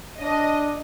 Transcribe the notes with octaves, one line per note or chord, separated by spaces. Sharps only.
D4 D#5